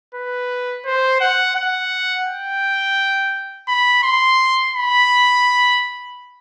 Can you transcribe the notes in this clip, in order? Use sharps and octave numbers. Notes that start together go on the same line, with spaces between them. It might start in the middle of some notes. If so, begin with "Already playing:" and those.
B4
C5
F#5
F#5
G5
B5
C6
B5